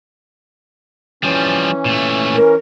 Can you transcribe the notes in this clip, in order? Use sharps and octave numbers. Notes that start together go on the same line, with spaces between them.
E3 F3 G3 C#4
A#2 A3
A#4